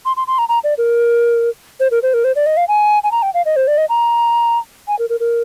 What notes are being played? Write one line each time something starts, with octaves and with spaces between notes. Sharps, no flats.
C6
C6
C6
A#5
A#5
D5
A#4
C5
A#4
C5
A#4
C5
D5
D#5
F5
G#5
G#5
A#5
G5
F5
D#5
C5
D5
D#5
A#5
G#5
A#4
A#4
A#4